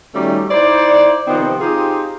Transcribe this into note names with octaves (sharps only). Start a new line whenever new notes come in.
D#3 F#3 G3 A3 C#4 D#4
D#4 E4 C5 D5
C3 D#3 F3 B3 C4 D#4
C4 D#4 F4 G4 G#4